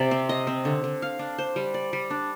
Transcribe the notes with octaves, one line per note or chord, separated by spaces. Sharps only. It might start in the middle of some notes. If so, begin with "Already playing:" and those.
Already playing: C3 D5
C4
D#5
C4
D3
D3
F5
D4
C5
G3
D5
G3
D4